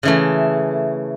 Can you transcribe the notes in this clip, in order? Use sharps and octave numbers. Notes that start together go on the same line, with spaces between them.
C#3 E3 A3